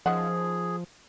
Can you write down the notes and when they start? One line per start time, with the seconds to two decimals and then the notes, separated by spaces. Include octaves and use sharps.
0.06 D#3 F3 C#4 G#4 F#5